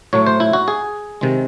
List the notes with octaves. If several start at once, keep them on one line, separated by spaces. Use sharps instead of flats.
A2 F#3 A3 C#5
C5
E4
F#4
G#4
C3 D#3 G#3